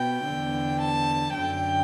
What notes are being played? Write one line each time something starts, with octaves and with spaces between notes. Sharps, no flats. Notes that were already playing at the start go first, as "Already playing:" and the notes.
Already playing: B2 G5
E2 D3
A5
F#2 D3 G5